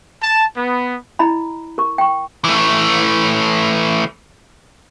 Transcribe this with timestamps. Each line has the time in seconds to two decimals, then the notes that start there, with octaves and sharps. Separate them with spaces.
0.22 A5
0.57 B3
1.19 E4 D#5 A#5 B5
1.78 A#4 C#6
1.98 G5 C#6
2.44 E3 A3